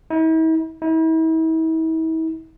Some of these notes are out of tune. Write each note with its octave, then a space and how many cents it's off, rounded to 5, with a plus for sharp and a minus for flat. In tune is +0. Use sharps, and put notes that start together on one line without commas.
E4 -45
E4 -40